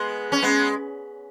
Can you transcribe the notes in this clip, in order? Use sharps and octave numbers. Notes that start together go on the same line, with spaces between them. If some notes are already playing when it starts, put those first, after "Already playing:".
Already playing: G#3 B3
C#4
G#3 B3